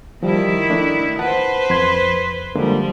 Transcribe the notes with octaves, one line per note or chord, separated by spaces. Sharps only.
D#3 F3 G3 E4
A3 D4
B4 C5 F#5 A5
F2 C6 G#6
D3 F3 G3 G#3 A#3